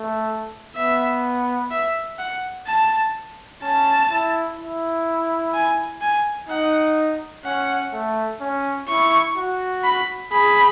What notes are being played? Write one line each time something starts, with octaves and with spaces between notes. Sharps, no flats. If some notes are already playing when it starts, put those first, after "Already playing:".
Already playing: A3
B3 E5
E5
F#5
A5
C#4 A5
E4
E4
G#5
G#5
D#4 F#5
C#4 F#5
A3
C#4
E4 C#6
F#4
B5
G#4 B5